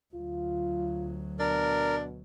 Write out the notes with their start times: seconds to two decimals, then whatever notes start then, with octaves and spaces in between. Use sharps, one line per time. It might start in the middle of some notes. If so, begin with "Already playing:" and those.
0.14 D2 F#3 F4
1.40 B2 D4 A#4